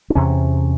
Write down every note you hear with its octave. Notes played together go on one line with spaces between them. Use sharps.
D4
E2 C3 C#4